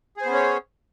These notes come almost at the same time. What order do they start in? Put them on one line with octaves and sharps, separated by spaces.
G#4 C5 B3 C#4 C#5